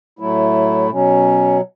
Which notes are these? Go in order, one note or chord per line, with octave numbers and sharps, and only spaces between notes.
A2 F#3 A3 E4
B2 F#3 C#4